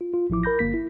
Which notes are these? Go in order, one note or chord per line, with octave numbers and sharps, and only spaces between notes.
F4
F4
A1 F3 E4 D6
A#4 B5 G6 A#6
G1 A#3 B6
E4